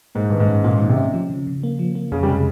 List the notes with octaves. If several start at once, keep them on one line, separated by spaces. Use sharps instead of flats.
G#2 A#3
G2 D#3
G#2
C#4
A#2 A#3
G#2 D#3
C3
C#4
F3
C#3
C#3
A#3
F3
A#3
F2 C#3
G3
C3 G#3